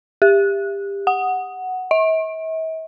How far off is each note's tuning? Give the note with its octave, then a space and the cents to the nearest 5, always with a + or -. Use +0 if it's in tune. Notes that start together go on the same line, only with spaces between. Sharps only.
G4 +25
F#5 +0
E5 -45